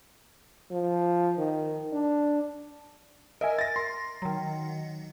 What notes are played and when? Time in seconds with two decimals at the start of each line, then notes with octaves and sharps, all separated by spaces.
0.71 F3
1.38 D#3
1.93 D4
3.41 A#4 D#5 E5 G#5
3.59 A6 A#6
3.76 C6
4.22 D#3 F#3